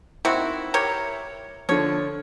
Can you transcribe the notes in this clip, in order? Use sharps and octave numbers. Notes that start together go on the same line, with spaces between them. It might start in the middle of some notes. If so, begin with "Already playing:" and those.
D#3 C4 E4 F#4
G4 A#4 C#5
D3 F3 C#5